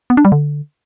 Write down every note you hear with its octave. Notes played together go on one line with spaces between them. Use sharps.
B3
D4
G3
D3